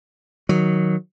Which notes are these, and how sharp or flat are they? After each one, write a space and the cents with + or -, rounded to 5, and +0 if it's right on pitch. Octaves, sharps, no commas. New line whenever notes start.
D#3 +0 F#3 -5